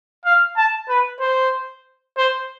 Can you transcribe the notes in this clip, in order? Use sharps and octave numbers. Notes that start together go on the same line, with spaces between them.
F5
A5
B4
C5
C5